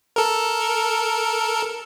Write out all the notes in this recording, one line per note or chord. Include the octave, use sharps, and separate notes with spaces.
A4 A#4